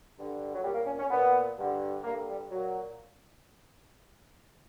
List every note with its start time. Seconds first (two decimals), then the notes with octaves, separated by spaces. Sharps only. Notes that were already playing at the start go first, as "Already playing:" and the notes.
0.16 G2 D3
0.55 F#3
0.63 A#2 G3
0.75 A#3
0.86 C#4
0.99 C#4
1.10 A#2 B3
1.57 G2 D3
2.04 G2 D3 A#3
2.27 G3
2.51 A#2 F#3